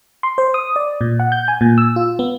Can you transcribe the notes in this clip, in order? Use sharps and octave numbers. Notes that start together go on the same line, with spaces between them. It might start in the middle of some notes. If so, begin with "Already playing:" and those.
C6
C5
D#6
D5
A#2
F#5
G6
G#5
A#2
E6
F4
B3